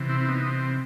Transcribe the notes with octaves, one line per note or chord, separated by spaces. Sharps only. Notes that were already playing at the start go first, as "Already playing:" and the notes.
Already playing: C3 E3
C4 E4
E4
B3 D#4
C4